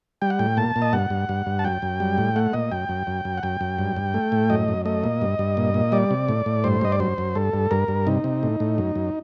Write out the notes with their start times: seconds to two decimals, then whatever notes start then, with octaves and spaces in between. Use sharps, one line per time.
0.22 G3 G5
0.30 F#5
0.39 A2 G5
0.57 A#2 A5
0.76 A#2
0.82 D#5
0.93 G2 F#5
1.10 G2
1.29 G2
1.46 G2
1.59 A5
1.65 F#2 G5
1.82 F#2
2.00 G3
2.18 A2
2.36 A3 F#5
2.53 A#2 D#5
2.71 F#2 G5
2.89 F#2
3.07 F#2
3.25 F#2
3.38 F#5
3.43 F#2 G5
3.61 F#2
3.78 G2
3.96 G2
4.14 A3
4.32 A2
4.50 F#2 D#5
4.68 F#2
4.85 A3 D#5
5.04 A#2
5.22 G2
5.39 G2
5.57 A#2
5.74 A#2
5.92 G3 D5
6.11 C3
6.28 A2
6.46 A2
6.64 G2 C5
6.81 G2 D#5
6.92 D5
7.00 F#2 C5
7.18 F#2
7.35 G2 A4
7.54 G2
7.71 G2 A#4
7.88 G2
8.07 C3 D#4
8.24 C3
8.43 A2
8.60 A2
8.78 F#2
8.95 F#2